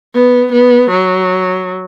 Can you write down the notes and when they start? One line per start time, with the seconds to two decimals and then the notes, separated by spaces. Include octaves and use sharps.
0.14 B3
0.52 B3
0.90 F#3